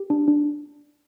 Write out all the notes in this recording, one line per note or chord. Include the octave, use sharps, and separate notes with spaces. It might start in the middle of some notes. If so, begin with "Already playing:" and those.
Already playing: G4
D4
D4